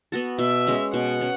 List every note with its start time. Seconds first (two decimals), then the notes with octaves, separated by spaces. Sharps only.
0.12 B3 F#4 A4
0.39 B2 E5
0.67 G#3 C#4
0.94 B2 F#5
1.21 C#4